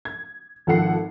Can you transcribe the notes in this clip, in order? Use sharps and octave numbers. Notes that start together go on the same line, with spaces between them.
G#6
G#1 F3 A4 F#5 C7